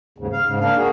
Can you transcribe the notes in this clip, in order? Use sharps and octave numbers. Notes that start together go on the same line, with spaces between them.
D#2 G#2 C#3
F5
G#2 C#3
A#3 D4 F5
A#3 F#4 G#4